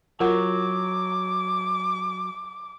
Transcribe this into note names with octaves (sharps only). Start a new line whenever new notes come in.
F#3 F4 A#4 F#5 D6